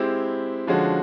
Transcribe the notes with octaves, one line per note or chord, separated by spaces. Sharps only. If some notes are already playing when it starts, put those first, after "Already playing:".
Already playing: G#3 C4 E4 G4
D3 F3 G#3 C#4 F#4